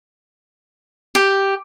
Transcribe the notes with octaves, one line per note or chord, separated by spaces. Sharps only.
G4